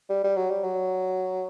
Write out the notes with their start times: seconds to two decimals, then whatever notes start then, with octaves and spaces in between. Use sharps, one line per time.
0.10 G3
0.24 G3
0.37 F#3
0.50 G3
0.64 F#3